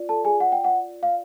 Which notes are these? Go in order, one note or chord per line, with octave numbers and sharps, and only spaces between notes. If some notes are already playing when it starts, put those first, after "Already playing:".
Already playing: F4 D5
A4 A5
G#4 G#5
F#5
G5
F#5
F5